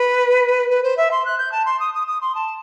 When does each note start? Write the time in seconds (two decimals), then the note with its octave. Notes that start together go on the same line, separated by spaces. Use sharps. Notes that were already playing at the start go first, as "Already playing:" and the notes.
Already playing: B4
0.70 B4
0.83 C5
0.97 E5
1.11 C6
1.25 F#6
1.38 G6
1.52 A5
1.65 C6
1.80 D#6
1.94 D#6
2.07 D#6
2.21 C6
2.35 A5